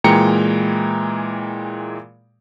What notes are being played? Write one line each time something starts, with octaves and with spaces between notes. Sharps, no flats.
A#2 E3 G#3 G5 A#5 C#7